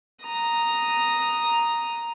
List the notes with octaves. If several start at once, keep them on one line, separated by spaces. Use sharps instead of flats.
A#5 D#6